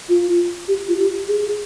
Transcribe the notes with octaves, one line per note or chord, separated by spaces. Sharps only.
F4
G4
F4
G4
G#4